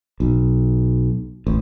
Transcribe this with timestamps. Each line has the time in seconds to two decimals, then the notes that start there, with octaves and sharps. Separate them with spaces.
0.20 B1
1.47 A1